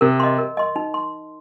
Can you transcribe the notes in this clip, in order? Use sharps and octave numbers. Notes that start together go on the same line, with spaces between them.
C3 A#4
D#5 C6
A#4
D#5 C6
D#4
C6